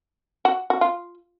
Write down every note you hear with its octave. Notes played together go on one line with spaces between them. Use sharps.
F#4
F#4
F4